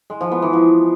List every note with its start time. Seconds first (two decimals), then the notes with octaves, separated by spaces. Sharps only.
0.10 G#3
0.21 F3
0.31 B3
0.42 E3
0.53 F3